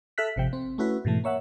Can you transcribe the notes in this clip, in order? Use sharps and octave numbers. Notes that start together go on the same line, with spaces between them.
A4 E5 F6 F#6 B6
G#1 C3 F3 G5
C4
A3 C#4 E4 F#4 B4
G#2 B2 E3 A3
A#3 C#5 E5 F#5